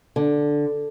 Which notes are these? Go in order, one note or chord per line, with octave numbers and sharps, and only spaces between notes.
D3